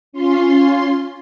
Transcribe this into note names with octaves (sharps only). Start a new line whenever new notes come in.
C#4 F4 C6